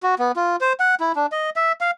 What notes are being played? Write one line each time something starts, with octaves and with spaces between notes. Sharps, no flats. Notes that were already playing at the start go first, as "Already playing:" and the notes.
F#4
B3
F4
C5
F#5
E4
D4
D#5
E5
F5